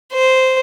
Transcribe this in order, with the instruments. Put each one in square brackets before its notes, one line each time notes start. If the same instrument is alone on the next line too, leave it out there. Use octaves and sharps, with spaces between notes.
[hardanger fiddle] C5